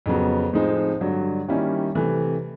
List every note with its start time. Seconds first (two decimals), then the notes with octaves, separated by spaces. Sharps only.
0.06 F2 C#3 F#3 B3
0.53 A2 F3 G#3 C4 D#4
1.01 G2 D3 F#3
1.48 D#3 G3 A#3 C#4 E4
1.95 C3 E3 A3